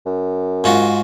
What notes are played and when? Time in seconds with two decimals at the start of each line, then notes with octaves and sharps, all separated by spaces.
0.06 F#2
0.64 G#2 F4 F#4